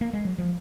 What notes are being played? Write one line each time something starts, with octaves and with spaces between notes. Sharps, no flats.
A#3
G#3
F#3
F3